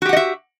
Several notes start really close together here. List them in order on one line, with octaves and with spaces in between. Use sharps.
F#4 G4 F#5 D#5 E5